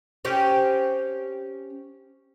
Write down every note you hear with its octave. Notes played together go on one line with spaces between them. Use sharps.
C4 C#4 G4